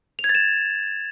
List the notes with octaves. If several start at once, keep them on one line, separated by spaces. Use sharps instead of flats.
F7
G#6
A6
E7